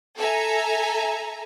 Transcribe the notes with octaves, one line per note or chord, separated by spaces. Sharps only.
A4 E5 G#5 A#5